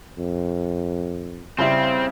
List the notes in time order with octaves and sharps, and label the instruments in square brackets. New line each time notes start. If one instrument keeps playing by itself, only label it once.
[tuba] F2
[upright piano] C#3 G3 E4 [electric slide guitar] C4